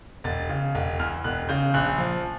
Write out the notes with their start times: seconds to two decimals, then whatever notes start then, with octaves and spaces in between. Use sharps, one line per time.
0.24 E1 A6
0.49 C#3
0.75 E1
0.99 E2 F6
1.24 E1 F#6
1.49 C#3 G6
1.74 A#1 F#6
1.98 F3